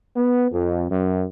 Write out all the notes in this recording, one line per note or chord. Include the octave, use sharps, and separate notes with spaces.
B3
F2
F#2